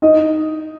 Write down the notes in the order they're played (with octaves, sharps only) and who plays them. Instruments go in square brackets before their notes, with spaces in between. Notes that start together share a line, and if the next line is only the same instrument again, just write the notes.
[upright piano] D#4 D#5